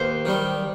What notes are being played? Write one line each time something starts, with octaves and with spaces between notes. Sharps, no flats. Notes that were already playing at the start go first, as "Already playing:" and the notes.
Already playing: D#2 C5
D#3 G3